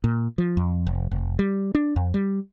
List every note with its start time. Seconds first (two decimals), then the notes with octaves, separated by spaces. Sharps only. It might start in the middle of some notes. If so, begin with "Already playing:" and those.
0.04 A#2
0.38 F3
0.57 F2
0.87 F1
1.11 F1
1.39 G3
1.75 D4
1.96 F2
2.14 G3